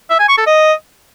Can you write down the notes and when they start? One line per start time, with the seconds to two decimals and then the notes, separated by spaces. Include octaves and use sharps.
0.10 E5
0.19 G#5
0.28 C#6
0.38 A4
0.47 D#5